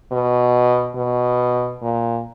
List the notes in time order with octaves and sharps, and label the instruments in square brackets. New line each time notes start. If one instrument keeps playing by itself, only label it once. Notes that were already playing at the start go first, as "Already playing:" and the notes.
[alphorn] B2
B2
A#2